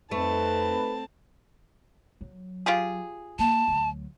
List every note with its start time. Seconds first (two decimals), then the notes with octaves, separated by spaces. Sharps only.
0.11 F2 A3 C4 D#4 B4 A5
2.21 F#3
2.66 F4 G4 G#4
3.39 A#3 A5
3.68 D2 F#3